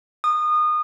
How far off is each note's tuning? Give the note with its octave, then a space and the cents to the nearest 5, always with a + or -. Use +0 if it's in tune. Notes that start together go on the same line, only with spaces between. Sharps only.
D#6 -25